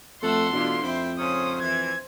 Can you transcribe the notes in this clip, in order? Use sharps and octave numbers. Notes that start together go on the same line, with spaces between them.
F2 A3 A4 F#5 C6
B2 D3 E3 D4 F4
F2 E4 C5 G5
G#2 C#3 C#4 C5 D#6
E3 G#6